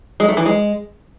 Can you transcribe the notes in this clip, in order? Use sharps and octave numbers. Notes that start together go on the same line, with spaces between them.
G#3
A3
E3
G#3